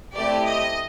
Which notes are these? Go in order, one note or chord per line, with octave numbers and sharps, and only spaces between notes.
A3 C4 E4 G4 D5
D#5